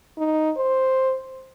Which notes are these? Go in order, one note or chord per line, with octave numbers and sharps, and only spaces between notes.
D#4
C5